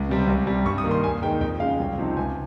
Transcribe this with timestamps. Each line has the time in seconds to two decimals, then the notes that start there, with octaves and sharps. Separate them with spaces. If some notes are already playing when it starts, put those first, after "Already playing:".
Already playing: C#2
0.09 C3 G3 C4
0.27 C2
0.47 C3 G3
0.66 G2 C#6
0.78 D#6
0.84 D#3 A#3
0.91 C6
1.03 D#2 G#5
1.22 D#3 G#3 D#4 G5
1.41 F2 G5
1.60 C#3 G#3 F5
1.79 C2
1.98 C3 F3 C4 D#4
2.17 C#2 G#5